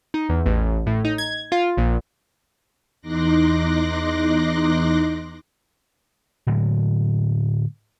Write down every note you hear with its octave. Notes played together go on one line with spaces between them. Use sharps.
D#4
E2
A1
A2
D#4
G#6
F4
A#1
E2 D#4 C6 D6 F#6 A#6
A2 D3 F#3 G#3